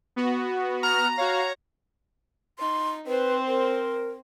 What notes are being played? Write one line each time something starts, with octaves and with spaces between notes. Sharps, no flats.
B3 F#4
A#5 F6
F#4 C#5 F5
D#4 C6
C4 B4 C5
A#4